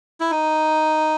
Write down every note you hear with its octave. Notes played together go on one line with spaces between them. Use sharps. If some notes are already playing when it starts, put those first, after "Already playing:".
E4
D#4